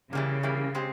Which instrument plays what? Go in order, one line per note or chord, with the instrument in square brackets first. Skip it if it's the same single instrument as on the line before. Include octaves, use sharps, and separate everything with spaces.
[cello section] C#3 [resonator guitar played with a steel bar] E3 G3 A#3
[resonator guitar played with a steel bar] E3 G3 A#3
G#3 C4 G4